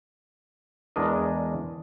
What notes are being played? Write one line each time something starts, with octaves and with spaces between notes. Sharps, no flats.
E2 G#3 D4 A#4 D#5